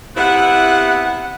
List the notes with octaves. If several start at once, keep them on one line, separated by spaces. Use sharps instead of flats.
C3 B3 E4 F#5